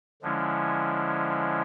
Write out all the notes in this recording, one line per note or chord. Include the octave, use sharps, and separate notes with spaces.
D3 F3 G#3 C#4 E4